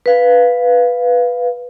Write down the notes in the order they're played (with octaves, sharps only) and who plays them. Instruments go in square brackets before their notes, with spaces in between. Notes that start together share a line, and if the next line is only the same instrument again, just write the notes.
[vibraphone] B4 F5